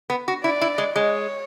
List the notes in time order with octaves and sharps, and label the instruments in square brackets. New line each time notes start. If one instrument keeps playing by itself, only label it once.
[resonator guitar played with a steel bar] B3
F#4
[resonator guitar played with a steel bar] E4 [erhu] D5
[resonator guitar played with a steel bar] E4
G#3
[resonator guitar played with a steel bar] G#3 [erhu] C#5